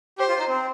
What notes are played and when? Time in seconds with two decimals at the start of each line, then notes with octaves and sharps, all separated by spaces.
0.19 G4 C5
0.29 F4
0.39 D#4
0.48 C4